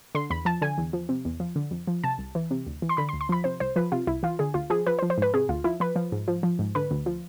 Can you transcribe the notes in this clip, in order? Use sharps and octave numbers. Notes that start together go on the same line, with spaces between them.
D3 C6
E2 B5
F3 A5
D3 G#5
E2
F3
C3
E2
F3
D3
F2
F3
C3 A5
C2
E3
C3
D2
E3
C6
D3 B5
C6
D2
C6
F3 B5
C3 C5
C2 C5
F3 B4
C3 F4
C2 E4
E3 F4
D3 G#4
D2 F4
F3 G#4
F3 B4
C5
F3
C5
G#2 B4
C3 G#4
D2 F4
F3 E4
F3 B4
F3
G#2
F3
F3
G#2
D3 B4
D2
F3